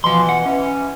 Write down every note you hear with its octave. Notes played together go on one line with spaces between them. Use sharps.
B2 E3 F3 C6
F#5
E3 C#4